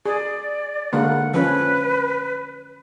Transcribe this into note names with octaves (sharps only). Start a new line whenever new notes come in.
G#4 D5
D3 G#3 A#3 F#5
F3 C#4 B4